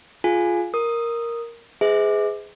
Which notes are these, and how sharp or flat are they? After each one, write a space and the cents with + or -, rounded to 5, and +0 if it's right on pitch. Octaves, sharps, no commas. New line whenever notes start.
F4 +0 G#4 +20 G#5 +0
A#4 +0 D#6 +0
G#4 +0 B4 +45 E5 -45